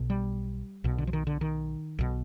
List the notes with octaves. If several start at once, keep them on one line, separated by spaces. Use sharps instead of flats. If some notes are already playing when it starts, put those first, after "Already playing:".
Already playing: B1 B2
G3
B1 B2
D3
F3
D#3
D3
D#3
B1 B2